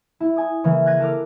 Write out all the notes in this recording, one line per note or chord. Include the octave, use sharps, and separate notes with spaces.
E4
G#5 D#6
C#3 E3 A#3
F#6 G#6 A#6 D#7
A4 A#4 D6 F6